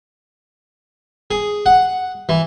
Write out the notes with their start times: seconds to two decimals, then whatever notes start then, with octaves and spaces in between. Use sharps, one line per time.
1.31 G#4
1.66 F#5
2.29 E3